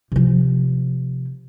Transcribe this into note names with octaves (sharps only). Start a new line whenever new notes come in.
C3 F3